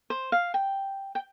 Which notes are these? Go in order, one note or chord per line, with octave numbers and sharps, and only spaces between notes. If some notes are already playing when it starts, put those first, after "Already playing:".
C5
F5
G5
G5